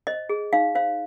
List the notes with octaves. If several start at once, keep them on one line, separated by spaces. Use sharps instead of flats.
C5 D#5
G#4
D#4 F5
C5 F5